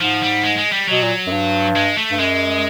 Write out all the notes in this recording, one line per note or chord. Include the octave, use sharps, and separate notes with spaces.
G#2 F3
G3
G#3
G#3
G3
B2 F#3
A#2
F#2
G2
G#3
A3
G2
F#2 G#3